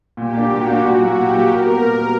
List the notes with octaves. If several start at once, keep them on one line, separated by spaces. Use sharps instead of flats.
A#2 G4
A#3 D4
A#2 F#4
A#3 D4
A#2
F#3 A#3 E4
A#2 G4
F#3 A#3 E4
A#2 A#4
G3 B3 F#4
A#2
G3 B3 F#4